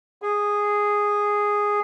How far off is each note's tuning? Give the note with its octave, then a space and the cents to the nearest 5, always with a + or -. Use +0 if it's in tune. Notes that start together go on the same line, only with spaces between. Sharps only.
G#4 -5